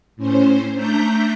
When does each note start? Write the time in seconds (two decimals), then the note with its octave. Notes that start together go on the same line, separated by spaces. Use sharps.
0.16 A2 C#4 C5
0.74 A3 D4 A#5 G6 B6